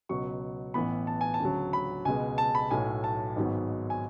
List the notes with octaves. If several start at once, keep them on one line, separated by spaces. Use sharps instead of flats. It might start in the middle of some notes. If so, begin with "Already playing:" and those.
C#2 B2 F#3 C#6
A1 A2 E3 B3 B5
A5
G#5
A5
D2 C#3 F#3
B5
C#2 B2 G#3 G#5
A5
B5
B1 A2 F#3 A3 G#5
A5
G#1 G#2 F#3 B3
G#5